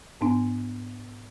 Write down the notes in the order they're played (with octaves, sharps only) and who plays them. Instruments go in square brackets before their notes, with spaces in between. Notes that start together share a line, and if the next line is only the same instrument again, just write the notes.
[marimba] G#2 B3 D4 G#5